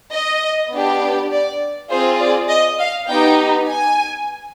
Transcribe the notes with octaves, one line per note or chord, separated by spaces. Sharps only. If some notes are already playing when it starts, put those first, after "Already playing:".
D#5
B3 D4 G4
D5
C4 F4 G#4 C5
D5
D#5
F5
B3 D#4 G4 G5
G#5